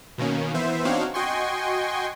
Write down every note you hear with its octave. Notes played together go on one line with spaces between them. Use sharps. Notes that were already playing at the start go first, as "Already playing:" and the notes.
B2 D#3 A#3 C#4
E3 B3 C5 E5
C4 D4 D#4 F#4 C#5 F5
F#4 D#5 G5 G#5 C6 C#6